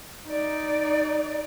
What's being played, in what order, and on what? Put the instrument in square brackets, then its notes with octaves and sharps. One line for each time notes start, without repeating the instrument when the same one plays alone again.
[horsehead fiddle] D#4 D5